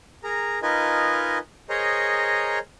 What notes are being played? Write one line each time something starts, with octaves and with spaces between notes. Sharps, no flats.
G#4 A#4 A#5
D#4 F4 A#4 B4 D#5 G#5
G#4 A#4 C5 C#5 D#5 A#5